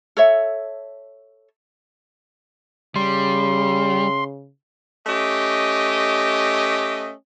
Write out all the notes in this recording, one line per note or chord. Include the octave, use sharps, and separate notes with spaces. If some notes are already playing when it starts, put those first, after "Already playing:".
A4 C#5 E5
C#3 G3 C6
A3 C#4 G4 D#5